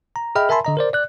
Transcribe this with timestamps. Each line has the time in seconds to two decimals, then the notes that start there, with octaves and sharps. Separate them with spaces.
0.16 A#5
0.35 G#4 D#5 E5 G5 B5 F6
0.49 A#4 E5 G#5 A5 B5 C6
0.65 D3 D#5 A#5
0.77 A#4 C5 D5
0.93 D5 F#6